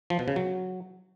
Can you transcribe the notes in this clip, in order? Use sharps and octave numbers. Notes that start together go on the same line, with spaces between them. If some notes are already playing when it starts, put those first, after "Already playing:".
F3
B2
C#3
F#3